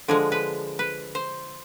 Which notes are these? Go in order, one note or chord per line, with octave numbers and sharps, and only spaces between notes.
D3 F3 G#3 G#4
B4
B4
C5